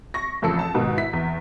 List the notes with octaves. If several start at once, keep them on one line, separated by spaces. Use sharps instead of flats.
C#6 A#6
A1 F2 C#3 A4 E6 C#7
A5
G#2 B2 D#3
E4 B6
E2